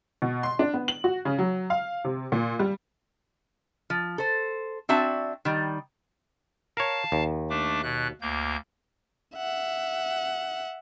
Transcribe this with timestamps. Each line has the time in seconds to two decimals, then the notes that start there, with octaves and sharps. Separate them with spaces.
0.22 B2
0.43 C6
0.59 D4
0.74 B3
0.88 F#7
1.04 F#4
1.25 C#3
1.39 F#3
1.70 F5
2.04 C3
2.32 A#2
2.59 G3
3.90 F3
4.18 A4 C5
4.89 C4 D4 F#4 E5 A5
5.45 D#3 G3
6.77 A#4 C#5 F5 A5
7.12 D#2
7.50 A3 D4 D6
7.83 B2 F#6
8.21 D2 A#3 G6
9.36 E5 F#5